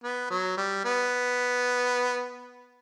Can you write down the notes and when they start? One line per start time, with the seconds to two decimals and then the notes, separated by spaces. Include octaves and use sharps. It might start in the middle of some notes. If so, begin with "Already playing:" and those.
0.04 B3
0.30 F#3
0.57 G3
0.85 B3